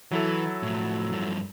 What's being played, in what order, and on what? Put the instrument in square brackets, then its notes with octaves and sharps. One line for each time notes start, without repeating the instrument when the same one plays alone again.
[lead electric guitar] E3 [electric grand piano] F#3 E4 A4
[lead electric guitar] A2 F3
G2 F3